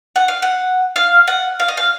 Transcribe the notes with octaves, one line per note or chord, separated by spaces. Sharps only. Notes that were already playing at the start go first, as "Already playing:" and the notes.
F#5
F5
F#5
F5
F#5
F5
D#5
F5